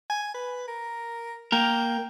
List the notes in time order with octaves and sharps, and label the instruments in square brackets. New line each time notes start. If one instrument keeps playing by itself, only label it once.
[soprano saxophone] G#5
B4
A#4
[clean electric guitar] A#3 A#4 [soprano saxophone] G5